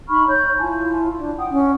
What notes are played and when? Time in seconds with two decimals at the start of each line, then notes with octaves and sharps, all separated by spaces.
0.09 D#4 B5 C#6 F6
0.28 C#5 G6
0.59 E4 F4 G#5 A5
1.16 D4
1.37 F#5 G5 D#6
1.51 C#4 F#5